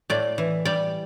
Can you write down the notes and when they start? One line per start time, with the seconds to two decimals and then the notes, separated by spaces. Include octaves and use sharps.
0.10 A2 D5
0.38 E3
0.65 G3 D5